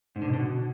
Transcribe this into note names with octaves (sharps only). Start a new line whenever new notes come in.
G#2
D3
B2
D3
B2